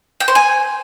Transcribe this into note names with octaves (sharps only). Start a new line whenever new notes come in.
G5
C5
G#5